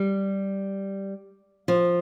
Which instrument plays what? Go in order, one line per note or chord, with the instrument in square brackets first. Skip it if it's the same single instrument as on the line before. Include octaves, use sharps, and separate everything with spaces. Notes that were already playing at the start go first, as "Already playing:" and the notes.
Already playing: [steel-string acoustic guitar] G3
F3